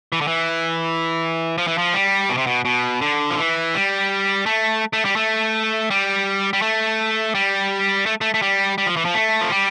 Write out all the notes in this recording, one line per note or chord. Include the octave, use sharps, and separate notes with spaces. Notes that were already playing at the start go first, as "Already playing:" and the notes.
E3
D3
E3
F3
E3
F3
G3
B2
C3
B2
B2
D3
F3
E3
G3
A3
A3
G3
A3
G3
G3
A3
G3
A3
A3
A3
G3
G3
F3
E3
F3
A3
F3
G3